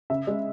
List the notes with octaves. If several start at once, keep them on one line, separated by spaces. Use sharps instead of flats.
C#3 E5
G#3